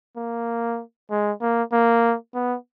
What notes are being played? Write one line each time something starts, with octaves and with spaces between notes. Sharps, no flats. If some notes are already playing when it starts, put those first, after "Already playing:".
A#3
G#3
A#3
A#3
B3